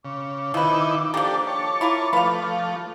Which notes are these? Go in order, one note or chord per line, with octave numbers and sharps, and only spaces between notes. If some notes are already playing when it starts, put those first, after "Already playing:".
C#3 D6
D#3 F3 D#4 E4 B4
F3 A#3 D4 G4 A4
C#5 A5
E4 F4 A#4
F3 A3 B4 F5